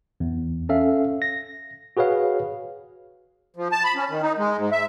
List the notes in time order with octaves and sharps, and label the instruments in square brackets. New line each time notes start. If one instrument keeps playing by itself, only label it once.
[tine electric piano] E2
C#4 A4 E5 F5
A#6
F#4 G#4 B4 C#5 F5
[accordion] F3
A5
B5
C#4
D#3
D#4
G#3
G#2
E5